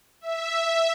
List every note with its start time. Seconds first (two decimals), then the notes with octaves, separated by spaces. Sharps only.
0.21 E5